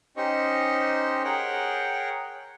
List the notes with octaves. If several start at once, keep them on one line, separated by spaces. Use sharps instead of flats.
C#4 D#4 G4 C5 D#5 C#6
G#4 A#4 C#5 F#5 G5